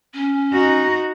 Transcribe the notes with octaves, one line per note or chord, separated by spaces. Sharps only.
C#4
D#4 F#4